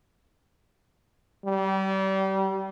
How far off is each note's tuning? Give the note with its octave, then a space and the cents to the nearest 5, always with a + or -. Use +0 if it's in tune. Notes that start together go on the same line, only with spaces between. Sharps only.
G3 -30